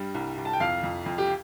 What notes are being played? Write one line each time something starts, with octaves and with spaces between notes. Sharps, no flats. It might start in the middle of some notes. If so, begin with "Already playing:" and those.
Already playing: G2 G3
C2
C2
A5
G5
F2 F5
F2
F2
G4